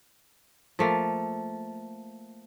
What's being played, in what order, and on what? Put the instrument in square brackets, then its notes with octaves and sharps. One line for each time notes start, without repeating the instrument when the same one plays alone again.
[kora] F3 A3 A#3